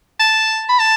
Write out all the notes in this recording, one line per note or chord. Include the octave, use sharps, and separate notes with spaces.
A5
B5
A5